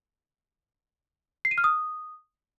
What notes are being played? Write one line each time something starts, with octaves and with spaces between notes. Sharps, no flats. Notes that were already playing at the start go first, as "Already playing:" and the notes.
C7
D#7
F6
D#6